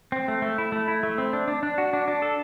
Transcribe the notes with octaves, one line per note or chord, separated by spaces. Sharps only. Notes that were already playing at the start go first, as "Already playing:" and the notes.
C4
A3
A3
E4
A3
E4
A3
C4
D4
D4
D4
F#4
D4
D4
A4